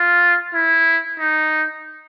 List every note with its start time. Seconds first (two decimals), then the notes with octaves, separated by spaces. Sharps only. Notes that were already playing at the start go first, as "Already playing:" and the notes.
Already playing: F4
0.55 E4
1.19 D#4